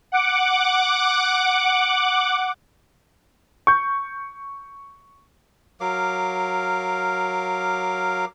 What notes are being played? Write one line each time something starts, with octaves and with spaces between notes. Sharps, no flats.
F#5 D6
C#6 G6
F#3 A#4 F5 D6